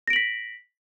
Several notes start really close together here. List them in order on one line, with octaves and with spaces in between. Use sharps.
A#6 D7 F#7 B6